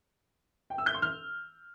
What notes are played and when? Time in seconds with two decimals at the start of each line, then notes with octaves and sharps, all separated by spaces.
0.70 G5
0.78 E6
0.86 G6
0.94 C6
1.02 F6